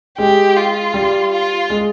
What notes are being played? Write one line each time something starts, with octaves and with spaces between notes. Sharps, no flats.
G#3 G4
F4
G3
F4
G#3